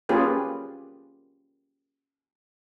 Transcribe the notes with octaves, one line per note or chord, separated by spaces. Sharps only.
A#3 C#4 F4 G4 G#4 B4